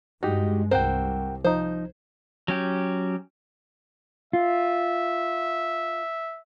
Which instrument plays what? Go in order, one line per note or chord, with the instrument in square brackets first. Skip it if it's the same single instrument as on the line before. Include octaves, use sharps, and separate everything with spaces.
[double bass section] G2 G#3 [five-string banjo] D#4 [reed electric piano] F#4 G4
[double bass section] C2 [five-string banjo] C4 C5 [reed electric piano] A#4 F#5 G5
[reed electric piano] F3 D#4 [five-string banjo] C5
[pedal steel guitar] F#3 C#4 G4
[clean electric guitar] F4 [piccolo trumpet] E5